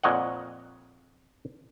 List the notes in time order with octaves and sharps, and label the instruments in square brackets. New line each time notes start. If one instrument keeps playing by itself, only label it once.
[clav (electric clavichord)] F2 A#2 C#5 D#5 F#5